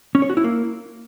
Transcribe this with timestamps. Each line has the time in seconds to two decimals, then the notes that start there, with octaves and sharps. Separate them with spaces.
0.15 C#4
0.22 C#5
0.30 F#4
0.37 E4
0.44 A#3